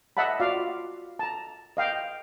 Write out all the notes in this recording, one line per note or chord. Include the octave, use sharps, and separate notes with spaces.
D#5 E5 F#5 A5 B5
F4 F#4 D5 F5
A5 A#5
D#5 F5 G5